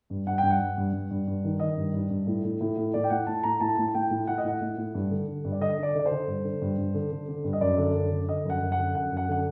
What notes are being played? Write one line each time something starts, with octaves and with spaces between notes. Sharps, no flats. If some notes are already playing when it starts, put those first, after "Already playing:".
G2
G2 F#5
G2 G5
F#5
G2
G2
G2
G2
G2
D#3
D#3 D#5
G2
G2
G2
A2
A2
A2
A2
A2 D5
G5
A2 F#5
A2 A5
A2 A#5
A2 A5
A2
A5
A2 G5
A2
A2 F#5
D#5
A2 F#5
A2
A2
G2
D3
D3
G2
D5
D3 D#5
D3 D5
D3 D5
C5
D3
G2
D3
G2
G2
D3
D3
D3
G2
D#5
F#2 D5
D3
F#2
D3
D3 D#5
F#2 F#5
F#2
F#5
D3
F#2 F#5
F#2
F#5
D3 F#5